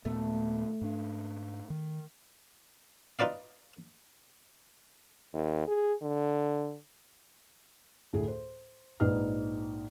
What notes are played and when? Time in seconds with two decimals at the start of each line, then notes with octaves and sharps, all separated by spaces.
0.05 D#2 A#2 A3 B3
0.81 G#2 D4
1.70 D#3
3.19 D#4 F4 B4 D5 F5
5.33 D#2
5.67 G#4
6.02 D3
8.13 D2 A2 G#4
8.28 C5
9.00 A#1 G#2 D#4 B4 F6